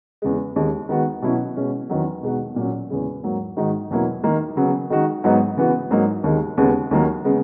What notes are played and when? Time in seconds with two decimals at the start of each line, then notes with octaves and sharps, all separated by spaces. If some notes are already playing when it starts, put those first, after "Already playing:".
0.22 E2 C#3 G#3
0.56 D#2 D#3 G#3
0.89 D#3 G#3 B3 F#4
1.22 B2 F#3 C#4 E4
1.56 B2 G#3 C#4
1.89 E2 D#3 F#3
2.23 B2 G#3 D#4 F#4
2.56 A#2 F#3 C#4
2.90 E2 C#3 G#3
3.23 G#2 F#3 A#3
3.56 G#2 D#3 G#3 D#4 F#4
3.90 E2 B2 F#3 A#3 E4
4.23 D#3 A#3 D#4
4.57 C#3 F#3 B3
4.90 D#3 G#3 D#4 F#4
5.24 G#2 F#3 B3 D#4
5.57 C#3 E3 B3 F#4
5.91 G#2 F#3 A#3 D#4
6.24 D#2 D#3 G#3
6.57 D#2 C#3 G#3 B3
6.91 D#2 D#3 F#3 A#3
7.25 C#3 G#3 B3